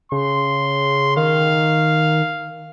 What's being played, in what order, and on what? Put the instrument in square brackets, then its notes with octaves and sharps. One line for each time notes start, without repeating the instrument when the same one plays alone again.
[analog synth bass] C#3 [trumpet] C6
[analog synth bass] D#3 [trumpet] F5